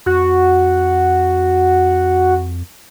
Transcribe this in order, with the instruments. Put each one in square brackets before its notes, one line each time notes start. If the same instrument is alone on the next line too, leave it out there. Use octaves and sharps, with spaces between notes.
[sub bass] F2 [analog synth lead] F#4